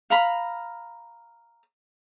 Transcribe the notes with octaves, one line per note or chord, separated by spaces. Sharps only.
F5 A#5 B5